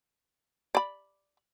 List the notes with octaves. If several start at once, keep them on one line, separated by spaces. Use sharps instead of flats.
D5 B5